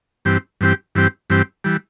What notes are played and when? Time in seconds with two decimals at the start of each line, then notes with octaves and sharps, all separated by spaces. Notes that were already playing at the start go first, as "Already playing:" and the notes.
0.25 G2 E3 C4 G4
0.61 G2 E3 C4 G4
0.95 G2 E3 C4 G4
1.30 G2 E3 C4 G4
1.64 E3 G3